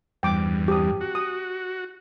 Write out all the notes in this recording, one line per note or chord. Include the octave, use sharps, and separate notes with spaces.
E2 G2 G5 D6
G4 D#6
F#4
D#6